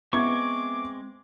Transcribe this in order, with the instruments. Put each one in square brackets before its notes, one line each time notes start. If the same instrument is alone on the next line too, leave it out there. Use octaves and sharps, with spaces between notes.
[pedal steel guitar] G#3 C4 C#6 [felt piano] B3 E5 G#6 [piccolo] D6